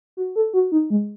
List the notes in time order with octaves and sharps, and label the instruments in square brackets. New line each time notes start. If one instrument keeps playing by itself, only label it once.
[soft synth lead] F#4
A4
F#4
D#4
G#3